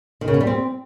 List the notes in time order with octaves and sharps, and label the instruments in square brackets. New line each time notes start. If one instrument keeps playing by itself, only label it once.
[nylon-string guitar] D#3
C#3
B3
G3
C4